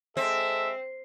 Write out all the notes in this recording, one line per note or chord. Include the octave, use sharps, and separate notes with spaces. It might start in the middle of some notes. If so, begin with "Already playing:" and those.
G#3 C4 A4 E5